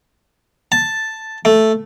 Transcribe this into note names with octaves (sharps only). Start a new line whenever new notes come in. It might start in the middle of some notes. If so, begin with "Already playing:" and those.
A5
A3